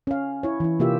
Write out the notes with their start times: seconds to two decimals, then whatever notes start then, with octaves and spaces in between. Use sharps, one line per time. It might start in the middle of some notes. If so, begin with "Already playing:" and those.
0.07 C#4 F5
0.43 E4 C#5
0.60 E3 E4
0.79 C3 A#3 F4 G4 E5